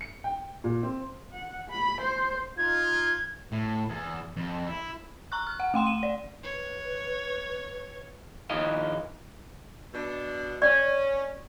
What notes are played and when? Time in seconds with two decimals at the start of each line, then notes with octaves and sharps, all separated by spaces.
0.01 C#7
0.24 G5
0.64 A#2
0.83 C4
1.33 F#5
1.70 B5
2.01 C5
2.57 D#4 F4 G#6
3.52 A2
3.89 E2
4.36 F2
4.67 E4
5.32 A#5 C#6 F#6
5.47 F6
5.60 F#5
5.74 A3 G5 C6 E7
5.86 D#7
6.03 D5
6.43 B4 C#5
8.50 D#3 F3 D#5 F5
9.94 B2 D4
10.62 C#4 D5